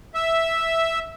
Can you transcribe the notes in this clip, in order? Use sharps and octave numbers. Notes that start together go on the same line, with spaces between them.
E5